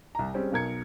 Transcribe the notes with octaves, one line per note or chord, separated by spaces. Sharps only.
C2 A#5
G3 G#3 C4 C#4
B1 B2 A#4 G#6 C#7